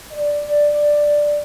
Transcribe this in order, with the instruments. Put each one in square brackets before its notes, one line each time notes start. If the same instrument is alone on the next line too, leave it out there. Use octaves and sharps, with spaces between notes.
[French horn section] D5